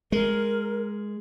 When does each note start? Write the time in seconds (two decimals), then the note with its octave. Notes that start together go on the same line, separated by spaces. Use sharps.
0.12 G#3 A#4